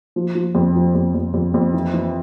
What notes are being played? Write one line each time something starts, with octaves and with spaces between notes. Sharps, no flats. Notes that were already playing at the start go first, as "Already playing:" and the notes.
F3
F3
F2
F3
F2
F2
F2
F2
E3
E3